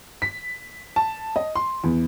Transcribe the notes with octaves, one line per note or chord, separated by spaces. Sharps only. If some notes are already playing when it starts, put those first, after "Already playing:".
B6
A5
D#5
C6
E2